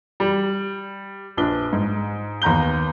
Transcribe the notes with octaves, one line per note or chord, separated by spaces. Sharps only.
G3
A#1 D4 B4 G7
G#2
D#2 B3 A#5 G6 G7